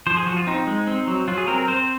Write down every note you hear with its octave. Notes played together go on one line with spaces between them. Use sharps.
F3 C5
G#4
F3 F#4
F4
C4 D#4
G#3
C4
F#3
F#3 F4
G#4
C4 A#4
A#4
C4 C5